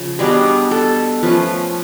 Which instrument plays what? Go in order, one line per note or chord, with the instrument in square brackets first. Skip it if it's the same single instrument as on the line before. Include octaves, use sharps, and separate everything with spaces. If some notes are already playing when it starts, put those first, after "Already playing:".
Already playing: [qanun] C#3 F3
B2 G3 B3 D4 G#4
A4
F3 A3 C#4 B4